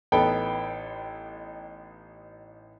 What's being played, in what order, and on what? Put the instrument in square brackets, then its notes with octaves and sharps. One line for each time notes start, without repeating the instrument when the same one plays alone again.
[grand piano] A1 B3 D#4 A4 G5 B5